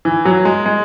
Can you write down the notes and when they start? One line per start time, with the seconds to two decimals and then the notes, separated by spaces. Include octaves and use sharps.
0.05 E3
0.25 F#3
0.45 G#3
0.66 G#3